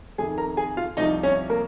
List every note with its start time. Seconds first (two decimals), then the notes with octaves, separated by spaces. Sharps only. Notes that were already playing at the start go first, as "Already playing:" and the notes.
0.18 F2 C3 D#3 G#4 G#5
0.38 A#4 A#5
0.57 G#4 G#5
0.77 F4 F5
0.97 C2 C3 F3 D#4 D#5
1.23 C#4 C#5
1.50 A#3 A#4